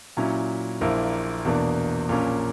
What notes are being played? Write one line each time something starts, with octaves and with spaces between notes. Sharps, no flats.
A#2 F#3 C#4 E4
A#1 A#2 A#3 E4
E2 B2 A#3 D4
A#1 A#2 A#3 C#4